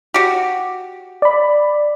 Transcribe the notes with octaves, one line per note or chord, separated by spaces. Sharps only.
F#4 G4
D5 B5